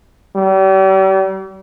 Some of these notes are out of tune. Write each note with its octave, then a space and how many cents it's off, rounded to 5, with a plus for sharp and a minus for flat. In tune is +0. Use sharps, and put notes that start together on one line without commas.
G3 -40